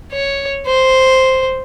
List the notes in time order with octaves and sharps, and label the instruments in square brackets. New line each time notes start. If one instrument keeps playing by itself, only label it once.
[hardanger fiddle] C#5
C5